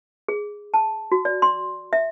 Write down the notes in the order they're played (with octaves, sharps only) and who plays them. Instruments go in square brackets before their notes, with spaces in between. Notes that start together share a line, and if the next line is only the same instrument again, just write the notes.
[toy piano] G#4
A5
F#4
D5
C6
E5